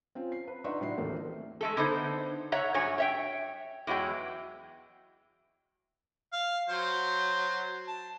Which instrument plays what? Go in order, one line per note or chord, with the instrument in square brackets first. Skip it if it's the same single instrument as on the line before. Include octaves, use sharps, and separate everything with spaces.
[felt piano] C4 C#4 F4
C7
B4
D4 D#4 E5 F#5 C6 C#6
A2 F#3 D4 E4 C7
D#1 A1 E3 A3 A#3 C4
[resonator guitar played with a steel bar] G#3 A3 A4
D3 B3 D#4 A4 C5
C#5 E5 F#5 A#5
G2 F#3 C#5 G#5
C#5 E5 G5
E2 E3 F#3 G#3 G5
[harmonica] F5
F#3 C5
A5